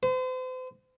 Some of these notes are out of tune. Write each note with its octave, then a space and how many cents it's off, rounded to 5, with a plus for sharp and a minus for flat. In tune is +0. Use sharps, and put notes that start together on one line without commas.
C5 -40